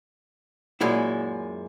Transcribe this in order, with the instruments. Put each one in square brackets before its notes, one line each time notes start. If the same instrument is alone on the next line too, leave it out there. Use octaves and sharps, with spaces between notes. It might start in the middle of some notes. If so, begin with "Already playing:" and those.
[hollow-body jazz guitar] F#2 A#2 G#3 E4